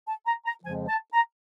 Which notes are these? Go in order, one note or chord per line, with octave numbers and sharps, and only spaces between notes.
A5
A#5
A#5
F2 C#3 F3 G#3 G#5
A5
A#5